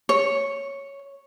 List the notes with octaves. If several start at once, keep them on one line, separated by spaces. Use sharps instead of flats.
C#5